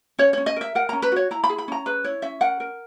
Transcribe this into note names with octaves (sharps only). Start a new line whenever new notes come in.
C#4 C#5
C#4 C#5
D#5
A#4 E5
A#4 F#5
C#4 A#5
B4
F#4 C#5
E4 A#5
B5
G#4
B5
C#4 A#5
G#4 B4
E4 C#5
C#4 E5
A#4 F#5
A#4